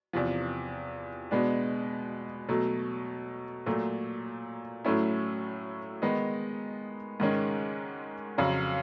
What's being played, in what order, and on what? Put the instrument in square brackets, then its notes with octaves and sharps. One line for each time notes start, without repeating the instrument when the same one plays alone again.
[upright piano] E2 C3 F3
B2 G#3 B3 D4
B2 F#3 A3
A#2 F#3 A3
A2 F#3 A3 C#4 E4
D#3 G#3 B3 D#4
G#2 D#3 G#3 C#4
F2 C#3 F#3